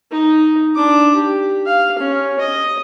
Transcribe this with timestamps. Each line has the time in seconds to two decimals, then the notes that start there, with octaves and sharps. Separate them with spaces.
0.11 D#4
0.75 D4 D6
1.15 G4
1.66 F5
1.98 C#4
2.39 D#5